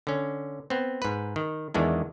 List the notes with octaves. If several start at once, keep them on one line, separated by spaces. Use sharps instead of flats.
D3 C#4
B3 C4
G#2 B4
D#3
E2 D#3 E3 G#3 D4